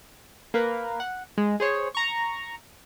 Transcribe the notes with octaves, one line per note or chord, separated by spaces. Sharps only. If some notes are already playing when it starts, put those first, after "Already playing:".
A#3 A#4 B4
F#5
G#3
G#4 C5 C#5
A#5 C#6